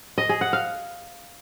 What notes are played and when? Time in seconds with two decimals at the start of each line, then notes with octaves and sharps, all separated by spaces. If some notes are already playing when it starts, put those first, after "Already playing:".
0.18 D#5
0.29 G#4
0.41 F#5
0.53 F5